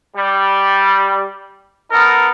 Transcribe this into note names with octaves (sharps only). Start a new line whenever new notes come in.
G3
B3 D#4 A4 A#4